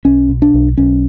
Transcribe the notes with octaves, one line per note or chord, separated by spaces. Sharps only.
B1 C#4
B2
D4
B1
B1 C#4